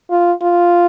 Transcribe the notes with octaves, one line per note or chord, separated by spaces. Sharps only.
F4
F4